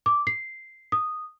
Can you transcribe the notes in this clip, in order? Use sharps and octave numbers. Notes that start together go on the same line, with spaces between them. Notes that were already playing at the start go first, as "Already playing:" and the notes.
D6
C7
D#6